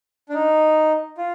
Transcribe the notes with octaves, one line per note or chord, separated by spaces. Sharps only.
D4
D#4
F4